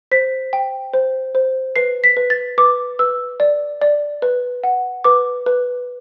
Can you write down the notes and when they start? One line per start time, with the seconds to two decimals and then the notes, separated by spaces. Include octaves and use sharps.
0.11 C5 B6
0.53 G5
0.94 C5
1.35 C5
1.76 B4 C7
2.04 B6
2.17 B4
2.30 A6
2.58 B4 D6
2.99 B4 E6
3.40 D5
3.82 D5
4.22 B4
4.64 F#5
5.04 B4 D6
5.46 B4